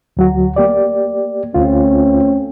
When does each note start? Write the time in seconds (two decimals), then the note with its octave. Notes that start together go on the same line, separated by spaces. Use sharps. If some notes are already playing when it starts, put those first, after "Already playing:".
0.17 D2 F#3 F#4
0.56 A#3 G4 D5
1.54 D2 A3 C4 C#4 F4